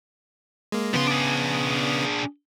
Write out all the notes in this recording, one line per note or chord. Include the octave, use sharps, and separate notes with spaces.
G#3 A#3
C#3 F3 B3 C6
D4 G#4